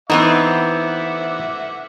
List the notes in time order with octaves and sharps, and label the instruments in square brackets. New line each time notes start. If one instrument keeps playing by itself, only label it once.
[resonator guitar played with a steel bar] E3 B3 C4 [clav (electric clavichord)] D#4 [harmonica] E5 F#5 D6